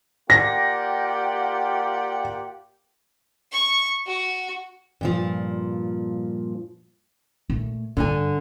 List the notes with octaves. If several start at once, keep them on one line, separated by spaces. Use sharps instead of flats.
A#3 F4 G4 D5 F#5 G5 A#6
C#6
F#4
G2 A#2 F3
A#2 A3
G2 D3 D4 G#5